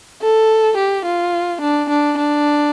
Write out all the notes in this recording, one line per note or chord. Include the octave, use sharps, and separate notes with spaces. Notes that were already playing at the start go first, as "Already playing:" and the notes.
A4
G4
F4
D4
D4
D4